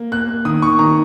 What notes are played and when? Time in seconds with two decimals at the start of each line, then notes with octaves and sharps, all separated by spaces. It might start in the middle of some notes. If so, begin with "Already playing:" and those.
Already playing: A#3
0.12 A#3 F#6
0.45 D#3 D#6
0.62 C#6
0.79 D#3 A#5